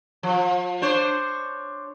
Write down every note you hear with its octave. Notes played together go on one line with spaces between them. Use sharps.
F3
D4 C5 C#5